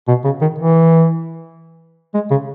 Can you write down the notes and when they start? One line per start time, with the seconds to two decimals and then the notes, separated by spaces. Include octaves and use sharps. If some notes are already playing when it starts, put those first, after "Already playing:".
0.08 B2
0.25 C#3
0.41 D#3
0.59 E3
2.14 G#3
2.31 C#3